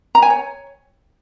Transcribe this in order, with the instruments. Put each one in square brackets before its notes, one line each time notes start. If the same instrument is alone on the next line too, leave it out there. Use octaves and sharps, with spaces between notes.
[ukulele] A#5
G#5
C#5